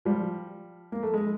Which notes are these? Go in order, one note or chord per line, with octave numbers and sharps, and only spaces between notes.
F3 G3
A#3
A3
G#3